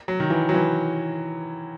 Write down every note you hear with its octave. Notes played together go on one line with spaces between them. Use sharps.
F#3
D#3
E3
F#3
E3